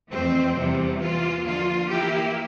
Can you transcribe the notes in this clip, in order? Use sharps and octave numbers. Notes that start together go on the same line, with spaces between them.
F2 E3 A3 C4
E2 C3 E3 G3
E3 A#3 F4
D3 F3 A#3 F4
E3 A#3 E4 G4